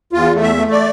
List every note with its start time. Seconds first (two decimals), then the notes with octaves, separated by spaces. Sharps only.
0.13 E2 F4
0.34 A3
0.43 E5
0.56 A3
0.71 D5